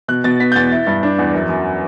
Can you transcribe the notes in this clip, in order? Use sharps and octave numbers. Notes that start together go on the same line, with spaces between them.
B2 F#6
B2 A6
B3 B6
G6
E2 A6
E4
G2
D4
E2
F#2
F#2